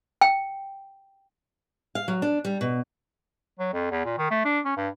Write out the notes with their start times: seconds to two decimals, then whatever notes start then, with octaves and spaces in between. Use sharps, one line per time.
0.21 G5
1.95 F5
2.08 F#3
2.22 D4
2.45 G3
2.61 B2
3.59 F#3
3.73 F2
3.91 E2
4.05 A#2
4.18 D#3
4.30 A3
4.45 D4
4.65 C#4
4.77 G2